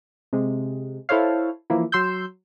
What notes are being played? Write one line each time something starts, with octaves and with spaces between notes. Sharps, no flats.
C3 G#3
E4 A4 C5 C#5 F5
E3 F3 A#3 E4
F#3 C6 E6 G6